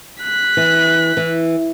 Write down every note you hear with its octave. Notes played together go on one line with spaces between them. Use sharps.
F#6 B6
E3
E3